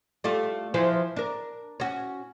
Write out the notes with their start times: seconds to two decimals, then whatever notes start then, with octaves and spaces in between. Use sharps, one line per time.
0.24 G3 A3 F4
0.74 E3 F3 C5
1.16 D4 A#4
1.80 C#4 F#4